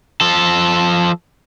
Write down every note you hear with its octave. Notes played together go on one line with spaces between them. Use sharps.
F3 A4